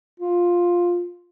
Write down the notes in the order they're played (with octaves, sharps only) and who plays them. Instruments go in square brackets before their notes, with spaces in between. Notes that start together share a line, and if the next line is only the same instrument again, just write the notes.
[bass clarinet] F4